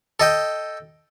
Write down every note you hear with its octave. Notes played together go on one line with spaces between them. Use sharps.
A4 D#5 G5